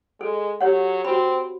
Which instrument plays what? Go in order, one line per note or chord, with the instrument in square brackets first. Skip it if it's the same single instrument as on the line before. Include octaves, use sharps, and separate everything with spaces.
[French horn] G#3 [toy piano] A4
[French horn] F#3 [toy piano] G4 C#5 F#5
[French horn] C4 [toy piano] F#4 B5